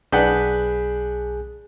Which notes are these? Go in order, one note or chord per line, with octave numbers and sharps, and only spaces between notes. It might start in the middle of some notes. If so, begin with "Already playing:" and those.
B1 D4 G#4 B4 F#5 G6